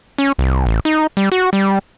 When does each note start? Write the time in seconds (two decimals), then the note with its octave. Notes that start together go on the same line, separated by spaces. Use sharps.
0.18 C#4
0.39 C2
0.66 A1
0.85 D#4
1.17 G3
1.32 F#4
1.53 G3